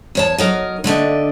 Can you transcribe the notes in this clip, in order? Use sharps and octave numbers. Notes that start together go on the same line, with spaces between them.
E2 C#5 A5
F#3 D#4 A#4
D3 A3 D4 D#4